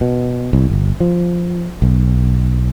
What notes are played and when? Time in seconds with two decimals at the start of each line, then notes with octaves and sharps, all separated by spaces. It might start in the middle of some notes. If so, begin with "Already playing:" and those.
0.01 B2
0.53 C2
0.70 G1
1.00 F3
1.82 B1